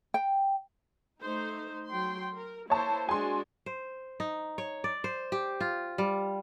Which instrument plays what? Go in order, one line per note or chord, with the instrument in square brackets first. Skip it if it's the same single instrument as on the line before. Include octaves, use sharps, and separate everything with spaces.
[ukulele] G5
[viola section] A3 D#4 C5
F#3 G5 C6
A#4
[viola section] A#3 E4 C5 [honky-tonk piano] C#5 A5
[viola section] G#3 D4 F#4 [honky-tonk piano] G#5 C6
[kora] C5
D#4
C#5
D5
C5
G4
F4
G3